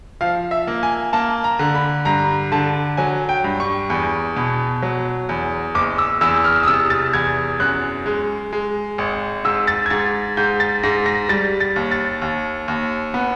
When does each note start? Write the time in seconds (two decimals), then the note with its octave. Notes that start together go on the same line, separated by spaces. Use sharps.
0.21 F3 F5
0.51 E5
0.67 A#3
0.83 G#5
1.13 A#3 A5
1.44 A#5
1.59 D3
1.75 B5
2.05 G2 A#5
2.52 D3 A5
2.97 F#3 G#5
3.29 G5
3.44 G2
3.60 C#6
3.90 E2
4.36 B2
4.82 F#3
5.29 E2
5.75 F#1 D6
5.98 E6
6.21 E2 E6
6.44 F6
6.63 D#6
6.67 C3 E6
6.90 A6
7.13 E2 G#6
7.60 F#2 F#6
8.06 G#3
8.53 G#3
8.98 G#1
9.44 G#2 E6
9.67 A6
9.86 G#6
9.90 G#2 A6
10.37 G#2 G6
10.60 A6
10.83 G#2 A#6
11.06 A#6
11.29 G3 A6
11.60 A6
11.76 D#2
11.92 A6
12.22 D#2
12.68 D#2
13.14 B3